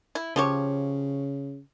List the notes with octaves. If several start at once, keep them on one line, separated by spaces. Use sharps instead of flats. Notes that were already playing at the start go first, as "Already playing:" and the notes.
E4
C#3 F3 G4 C#5